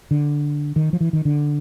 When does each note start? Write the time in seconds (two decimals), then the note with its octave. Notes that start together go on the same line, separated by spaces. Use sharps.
0.11 D3
0.76 D#3
0.93 F3
1.01 E3
1.13 D#3
1.25 D3